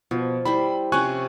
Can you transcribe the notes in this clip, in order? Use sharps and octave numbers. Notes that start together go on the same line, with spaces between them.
B2 F3
G3 E4 C5 B5
C3 F3 C#4 G#5 C#6 F#6